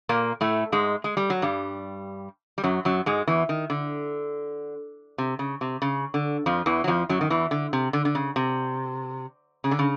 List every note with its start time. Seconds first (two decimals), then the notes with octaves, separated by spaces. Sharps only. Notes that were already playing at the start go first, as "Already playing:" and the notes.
0.09 A#2 A#3
0.41 A2 A3
0.72 G#2 G#3
1.04 G#3
1.17 G3
1.30 F#3
1.42 G2 G3
2.58 G3
2.63 F#2 F#3
2.85 F#2 F#3
3.06 G#2 G#3
3.27 E2 E3
3.49 D#3
3.70 D3
5.18 C3
5.39 C#3
5.61 C3
5.82 C#3
6.14 D3
6.46 F2 F3
6.66 E2 E3
6.84 F#3
6.88 F2 F3
7.09 F#2 F#3
7.21 D#3
7.30 E2 E3
7.51 D3
7.73 C3
7.93 D3
8.05 D3
8.15 C#3
8.36 C3
9.64 C#3
9.71 D3
9.79 C#3